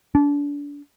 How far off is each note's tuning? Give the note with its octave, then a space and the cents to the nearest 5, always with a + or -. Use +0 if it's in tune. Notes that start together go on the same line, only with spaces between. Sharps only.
D4 -30